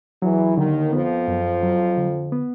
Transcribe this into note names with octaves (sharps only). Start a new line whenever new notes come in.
E2 E3 F#3
D#2 D3 D#3
F2 F3 B3
F#2
F#3
D3
B3